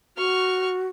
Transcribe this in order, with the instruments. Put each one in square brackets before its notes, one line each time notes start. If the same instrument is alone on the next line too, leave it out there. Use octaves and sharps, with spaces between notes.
[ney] F#4 [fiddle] C#6 F6